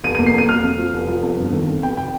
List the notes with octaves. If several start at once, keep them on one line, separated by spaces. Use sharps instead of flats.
F1 D#7
D#7
A#3
C7
F2 D#7
F2 F6
F2
F3
F1
F3
F2
G1
D#3
F2
F1 G5
G5